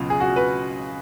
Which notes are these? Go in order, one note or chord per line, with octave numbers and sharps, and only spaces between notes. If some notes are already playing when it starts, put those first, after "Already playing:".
Already playing: C#2 B2 F#3 F4
G#4
F#4
B4